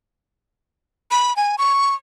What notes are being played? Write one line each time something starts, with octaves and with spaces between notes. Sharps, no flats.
B5
G#5
C#6